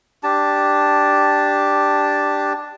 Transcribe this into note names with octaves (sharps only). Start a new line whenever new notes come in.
D4 G4 A5